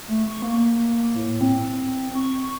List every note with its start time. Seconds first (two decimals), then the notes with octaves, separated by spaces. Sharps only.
0.08 A3
0.28 C#6
0.42 A#3
1.14 A2
1.41 C4
2.15 C#6